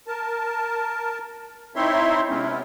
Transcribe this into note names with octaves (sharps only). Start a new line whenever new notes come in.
A#4 A5
C4 D#4 E4 C#5 E5 C6
C3 G#3 B3 C#4 E4